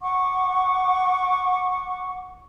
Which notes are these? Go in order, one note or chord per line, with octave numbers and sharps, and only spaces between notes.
F#5 C#6 D6